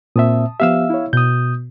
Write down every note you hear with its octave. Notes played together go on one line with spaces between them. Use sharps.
A#2 C4 E5 A5 D#6
F3 B3 G4 E5 F5 E6
E4 C#5
B2 D#6 G6